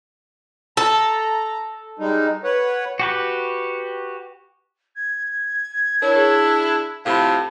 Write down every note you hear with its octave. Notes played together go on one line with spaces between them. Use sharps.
A4 A#5
G3 G#3 D#4
B4 C#5 F#5
F#4 G4 B4
G#6
D4 E4 A#4 C#5
G#4
A2 C3 F3 F5 A5 B5